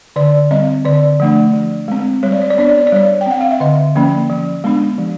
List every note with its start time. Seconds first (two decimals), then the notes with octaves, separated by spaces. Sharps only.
0.16 D3 D5
0.51 G3 C4 D#5
0.85 D3 D5
1.20 F3 A3 D4
1.54 F3
1.88 G#3 C4
2.23 G3 C#5
2.32 D5
2.41 C#5
2.50 D5
2.58 B3 D4 C#5
2.69 D5
2.78 C#5
2.87 D5
2.92 G3 C#5
3.21 G5
3.26 C4 F#5
3.41 F5
3.51 E5
3.60 D3 D#5
3.95 F3 A#3 C#4
4.30 F3
4.64 G#3 B3 D4
4.98 F3